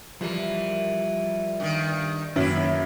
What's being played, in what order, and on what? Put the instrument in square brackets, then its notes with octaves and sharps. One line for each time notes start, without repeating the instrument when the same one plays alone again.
[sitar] E3 [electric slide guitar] F3 G3 A#4
[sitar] G2 B2 D#3
[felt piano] F#2 [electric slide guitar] D#3 A#3 [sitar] E4 B4